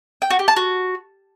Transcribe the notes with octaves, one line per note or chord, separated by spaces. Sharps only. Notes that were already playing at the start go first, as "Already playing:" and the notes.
G5
F#4
G4
A5
F#4